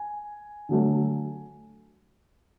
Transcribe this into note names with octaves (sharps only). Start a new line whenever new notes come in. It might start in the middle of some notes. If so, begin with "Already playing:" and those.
Already playing: G#5
D3 F#3 A3